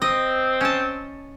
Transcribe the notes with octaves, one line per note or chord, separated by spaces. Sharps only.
C4 D#5
C#4 A5